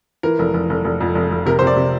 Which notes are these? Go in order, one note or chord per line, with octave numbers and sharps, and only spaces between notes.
E3 A#4
F1
F1
F1
F1
F2
F1
F1
C3 A#4
C5
C3
D5
C3